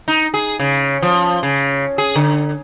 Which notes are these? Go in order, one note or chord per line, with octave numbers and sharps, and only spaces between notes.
D#4
G#4
C#3
F3
C#3
G#4
D3